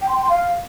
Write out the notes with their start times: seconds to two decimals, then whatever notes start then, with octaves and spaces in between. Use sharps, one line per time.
0.02 G5
0.09 C6
0.16 G5
0.22 C6
0.29 F5